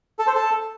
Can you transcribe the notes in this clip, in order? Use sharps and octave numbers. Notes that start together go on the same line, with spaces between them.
A4
C5
A4